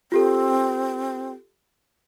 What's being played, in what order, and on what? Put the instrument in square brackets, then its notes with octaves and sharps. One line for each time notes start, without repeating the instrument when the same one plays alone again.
[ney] C4 [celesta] F4 G4 A4